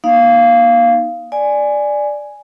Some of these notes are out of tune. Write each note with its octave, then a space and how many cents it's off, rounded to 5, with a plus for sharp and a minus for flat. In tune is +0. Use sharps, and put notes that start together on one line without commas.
A#3 +45 D#4 +0 F5 -10
D5 +5 G#5 +0